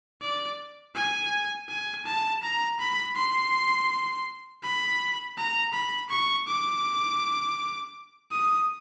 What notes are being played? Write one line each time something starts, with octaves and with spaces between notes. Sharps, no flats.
D5
G#5
G#5
A5
A#5
B5
C6
B5
A#5
B5
C#6
D6
D#6